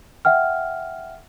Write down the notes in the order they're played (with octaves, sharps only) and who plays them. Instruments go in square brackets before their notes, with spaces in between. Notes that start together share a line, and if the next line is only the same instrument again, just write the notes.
[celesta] E5 F#5 G5 F6